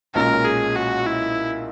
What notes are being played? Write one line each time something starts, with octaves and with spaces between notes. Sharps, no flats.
B1 A#2 G#3 C#4 A#4
G#4
F#4
E4